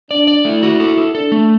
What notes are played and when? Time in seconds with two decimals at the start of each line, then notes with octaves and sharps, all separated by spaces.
0.10 D4 D5
0.27 D5
0.45 A3 E4
0.63 F#4
0.80 A4
0.97 A4
1.15 D4 A4
1.32 A3